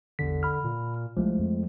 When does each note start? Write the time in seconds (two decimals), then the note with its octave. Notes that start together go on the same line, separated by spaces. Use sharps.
0.19 A1 E2 D3 B6
0.43 B5 F6
0.64 A#2
1.17 C2 F3 G#3 A3
1.39 F2